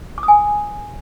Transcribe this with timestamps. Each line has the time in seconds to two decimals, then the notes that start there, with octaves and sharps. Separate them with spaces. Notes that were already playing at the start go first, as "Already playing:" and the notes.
0.18 D6
0.23 D#6
0.28 G#5